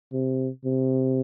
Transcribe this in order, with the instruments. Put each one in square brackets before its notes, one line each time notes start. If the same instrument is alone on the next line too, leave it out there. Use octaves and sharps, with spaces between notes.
[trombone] C3
C3